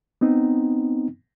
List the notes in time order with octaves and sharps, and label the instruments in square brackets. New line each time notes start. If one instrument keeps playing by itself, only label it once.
[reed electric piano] B3 C4 D#4